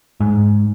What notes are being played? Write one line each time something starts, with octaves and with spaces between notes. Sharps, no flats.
G#2